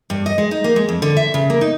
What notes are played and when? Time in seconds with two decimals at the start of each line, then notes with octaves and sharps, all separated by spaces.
0.10 G2
0.26 D#5
0.38 G#3
0.51 D#4
0.64 A#3
0.76 G#3
0.89 F2
1.02 D3
1.17 E5
1.34 C#3
1.50 A#3
1.61 D#4